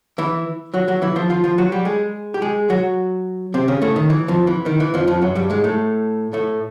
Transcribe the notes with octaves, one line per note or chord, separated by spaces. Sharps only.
E3 E4
F#3 F#4
F#3 F#4
E3 E4
F3 F4
F3 F4
F3 F4
F#3 F#4
G3 G4
G#3 G#4
G4
G#3 G#4
F#3 F#4
C3 C4
C#3 C#4
A2 A3
D#3
E3
F2 F3
E3
D#3
E3
F2 F3
F2 F3
F#2 F#3
G2 G3
G#2 G#3
A2 A3
A2 A3